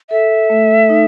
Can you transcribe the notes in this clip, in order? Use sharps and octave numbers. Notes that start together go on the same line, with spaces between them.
A4 E5
A3
D#4